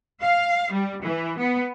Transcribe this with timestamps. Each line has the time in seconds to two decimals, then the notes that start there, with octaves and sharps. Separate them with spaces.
0.22 F5
0.72 G3
1.03 E3
1.39 B3